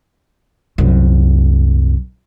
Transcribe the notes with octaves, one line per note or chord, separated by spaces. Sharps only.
C2 F#2